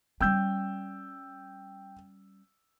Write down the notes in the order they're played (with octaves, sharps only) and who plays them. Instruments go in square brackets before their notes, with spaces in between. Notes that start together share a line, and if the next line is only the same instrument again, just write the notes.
[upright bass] G3 C#4 [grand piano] G5 E6 G6